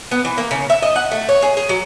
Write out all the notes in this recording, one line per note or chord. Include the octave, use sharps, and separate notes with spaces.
B3
E3
A#3
C#3
E5
D#5
F#5
A3
C#5
G#4
G#4
F#3